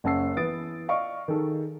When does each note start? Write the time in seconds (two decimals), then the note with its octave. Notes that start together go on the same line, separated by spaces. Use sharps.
0.04 F#1 C#4 F#5 A5 E6 C7
0.37 E3 B3 D#6 A6 D7
0.88 D5 D#5 F5 C#6 D7
1.28 D#3 D#4 G#4 A4